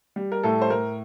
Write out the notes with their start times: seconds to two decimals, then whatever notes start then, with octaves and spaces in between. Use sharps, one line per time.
0.16 G3
0.32 A#4
0.44 A2 A4
0.62 C5
0.70 A2 A#4